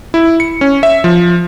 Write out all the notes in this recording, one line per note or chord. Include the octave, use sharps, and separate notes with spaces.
E4
C#7
C#4
E5
F3